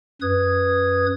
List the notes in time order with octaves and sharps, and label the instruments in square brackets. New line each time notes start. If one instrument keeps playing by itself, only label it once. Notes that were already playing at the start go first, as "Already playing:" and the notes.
[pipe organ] F#2 B4 D#6 G#6